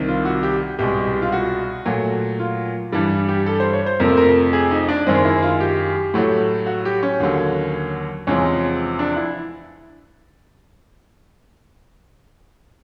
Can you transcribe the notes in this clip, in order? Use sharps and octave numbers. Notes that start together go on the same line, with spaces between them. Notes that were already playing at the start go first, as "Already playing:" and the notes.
Already playing: C2 C3 D#3
F4
F#4
G4
C2 B2 G#3 G4
F4
F#4
A#2 F#3 A3
F4
G2 E3 G3
G4
A4
C5
C#5
C5
F2 C3 F3 A3 A#4
A#4
G#4
D#4
D4
F#2 D#3 G#3 C4
E4
F4
G4
A2 F#3 A3
F#4
G4
C#4
D#2 D3 F#3
E2 C3 F3 G#3 C#4
D4
E4